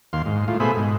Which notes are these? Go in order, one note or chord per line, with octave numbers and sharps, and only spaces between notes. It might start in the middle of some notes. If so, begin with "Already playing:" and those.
D#2 F5 C6
G#2
A2 F4
B2 A3 G#4 C5 E5 B5
G#2